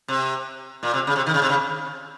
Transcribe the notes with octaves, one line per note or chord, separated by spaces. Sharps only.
C3
A#2
C3
C#3
C3
D#3
C#3
C3
C#3